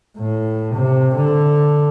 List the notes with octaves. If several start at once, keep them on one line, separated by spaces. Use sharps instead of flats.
A2
C3
D3